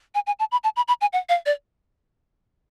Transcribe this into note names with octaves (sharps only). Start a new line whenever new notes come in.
G#5
G#5
A5
B5
A5
B5
B5
G#5
F#5
F5
D5